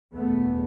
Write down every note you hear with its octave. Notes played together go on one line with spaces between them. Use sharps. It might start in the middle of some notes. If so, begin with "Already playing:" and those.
F#1 E2 B2 A3 B3